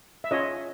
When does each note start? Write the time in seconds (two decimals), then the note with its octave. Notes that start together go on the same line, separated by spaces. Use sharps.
0.24 E5
0.31 C#4 F4 G#4 C#5 D#5